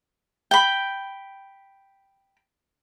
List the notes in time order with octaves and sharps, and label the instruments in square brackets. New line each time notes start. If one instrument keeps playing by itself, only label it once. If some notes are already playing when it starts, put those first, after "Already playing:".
[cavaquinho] G5 B5